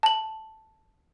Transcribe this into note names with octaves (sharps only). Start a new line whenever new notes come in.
A5 F#7